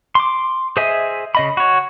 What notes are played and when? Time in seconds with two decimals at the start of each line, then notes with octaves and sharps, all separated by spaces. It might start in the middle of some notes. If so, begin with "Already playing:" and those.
0.15 C6 D6
0.77 G#4 C5 D#5 E5 G#5
1.35 C#3 D#5 B5
1.57 F#4 C#5